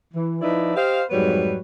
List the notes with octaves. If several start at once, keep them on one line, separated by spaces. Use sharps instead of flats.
E3
F3 D#4 E4 B4 D5 E5
G4 C5 D#5 F5
F2 G#2 F#3 G3 B4 C#5